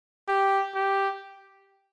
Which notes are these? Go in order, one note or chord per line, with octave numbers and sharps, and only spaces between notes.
G4
G4